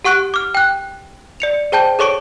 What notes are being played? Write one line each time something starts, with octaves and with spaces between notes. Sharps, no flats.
G4 F#5 C#6 F#6 D7
D6 F6
G5 F#6
D5 C#7 F7
G#4 C5 G5 A5 G6 G7
G#4 A4 C#5 C#6 D6 D7